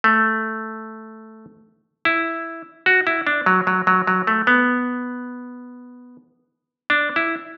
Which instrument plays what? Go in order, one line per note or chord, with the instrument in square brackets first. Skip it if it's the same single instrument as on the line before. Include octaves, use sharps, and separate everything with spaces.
[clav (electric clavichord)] A3
E4
F#4
E4
D4
F#3
F#3
F#3
F#3
A3
B3
D4
E4